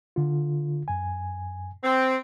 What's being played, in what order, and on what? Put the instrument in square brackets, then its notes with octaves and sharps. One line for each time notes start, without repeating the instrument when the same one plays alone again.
[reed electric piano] D3 F4
F#2 G#5
[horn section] C4